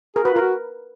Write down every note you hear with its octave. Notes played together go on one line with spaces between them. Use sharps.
G#4 A#4
F#4 B4
F4 A#4
F#4